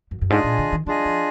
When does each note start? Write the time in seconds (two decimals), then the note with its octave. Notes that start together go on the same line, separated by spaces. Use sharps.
0.11 F#2
0.21 F#2
0.30 G#2 D4 F4 G#4 D#5 G#5
0.44 A#2
0.59 D3
0.72 D#3
0.87 F#3 D4 F4 G#4 D#5 G#5
1.05 F3